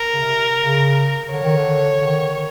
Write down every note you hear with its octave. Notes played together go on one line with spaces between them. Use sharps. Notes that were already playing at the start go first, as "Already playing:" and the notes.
Already playing: A#4
C#3
C3
C#3
D3 C#5
D#3
D3
D3
D#3